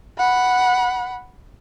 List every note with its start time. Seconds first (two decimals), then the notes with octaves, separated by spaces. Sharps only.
0.19 F#5 B5